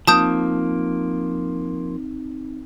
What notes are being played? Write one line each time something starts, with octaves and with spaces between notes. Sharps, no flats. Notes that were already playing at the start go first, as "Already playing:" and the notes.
F3 A#3 C4 D#4 A5 D#6 G6